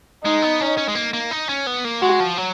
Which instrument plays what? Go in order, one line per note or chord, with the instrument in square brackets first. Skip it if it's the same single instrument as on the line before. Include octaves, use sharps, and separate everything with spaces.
[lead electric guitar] G#3 [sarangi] D#4
[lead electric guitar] B3
C#4
C#4
G#3
A#3
A#3
D#4
C#4
B3
A#3
[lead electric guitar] G#3 [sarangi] F#4
[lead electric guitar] F3
F#3